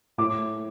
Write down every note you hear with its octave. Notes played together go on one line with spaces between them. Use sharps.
A2 D6